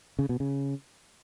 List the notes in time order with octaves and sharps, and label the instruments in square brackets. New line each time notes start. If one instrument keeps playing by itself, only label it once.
[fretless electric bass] C#3
B2
C#3